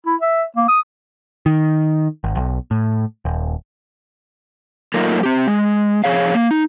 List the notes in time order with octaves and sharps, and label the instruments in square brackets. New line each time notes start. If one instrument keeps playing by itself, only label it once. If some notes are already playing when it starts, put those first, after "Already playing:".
[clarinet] E4
E5
A#3
D#6
[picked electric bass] D#3
G#1
B1
A2
D#1
[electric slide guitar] F#3 A3 A#3 D#4 F4 A#4
C4 G4
G#3
F3 G#4 C#5 F5
A#3
D#4